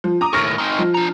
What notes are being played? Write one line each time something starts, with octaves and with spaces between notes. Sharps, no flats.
F3
A#5 D6 D#6
D#2 A2 C#6 F6 A#6
C4 D#4
F3
D4 A#5